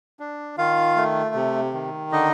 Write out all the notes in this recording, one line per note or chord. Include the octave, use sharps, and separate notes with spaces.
D4
D#3 F4 F5
A3
C3
D#3
D3 D#4 D#5